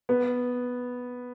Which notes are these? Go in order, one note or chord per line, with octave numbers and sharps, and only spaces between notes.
B3